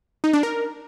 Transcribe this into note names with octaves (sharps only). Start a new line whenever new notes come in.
D#4
D4
A#4